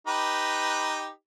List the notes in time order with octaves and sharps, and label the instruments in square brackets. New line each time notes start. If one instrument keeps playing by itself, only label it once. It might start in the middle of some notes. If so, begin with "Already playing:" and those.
[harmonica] D#4 G4 B4